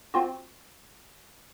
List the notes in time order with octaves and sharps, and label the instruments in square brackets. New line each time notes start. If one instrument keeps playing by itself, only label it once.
[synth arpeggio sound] C4 F4 F#4